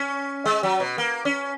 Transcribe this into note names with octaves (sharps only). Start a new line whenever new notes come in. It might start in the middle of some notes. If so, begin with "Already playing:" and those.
Already playing: C#4
G#3
F#3
B2
A#3
C#4